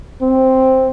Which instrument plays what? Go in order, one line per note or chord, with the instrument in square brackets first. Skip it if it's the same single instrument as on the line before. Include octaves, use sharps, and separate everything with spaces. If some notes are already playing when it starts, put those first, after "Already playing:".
[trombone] C4